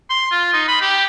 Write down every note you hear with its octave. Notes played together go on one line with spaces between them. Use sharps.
C6
F4
D#4
B5
G4